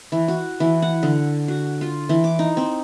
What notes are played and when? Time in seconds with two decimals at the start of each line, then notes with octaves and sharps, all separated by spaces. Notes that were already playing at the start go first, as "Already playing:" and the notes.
0.12 E3
0.28 F#4
0.60 E3
0.82 F#5
1.03 D3
1.48 F#4
1.81 F4
2.09 E3
2.24 D6
2.39 D#4
2.57 C4